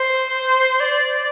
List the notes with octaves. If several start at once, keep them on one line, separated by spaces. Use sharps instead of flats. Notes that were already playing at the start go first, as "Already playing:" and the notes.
Already playing: C5
D5